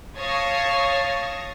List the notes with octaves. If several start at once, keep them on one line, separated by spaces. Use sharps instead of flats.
C#5 F5 A5 C#6 D#6 G#6 A#6